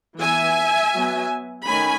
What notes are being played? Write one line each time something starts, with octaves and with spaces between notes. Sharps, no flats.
E3 B3 E5 G#5
F#3 B3
D#3 A3 C#4 G#5 B5